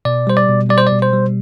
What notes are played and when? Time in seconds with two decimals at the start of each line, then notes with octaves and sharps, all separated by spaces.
0.05 B2 D5
0.27 G3 C5
0.37 D5
0.49 B2
0.69 G3 D5
0.78 C5
0.87 D5
0.92 B2
1.02 C5
1.13 G3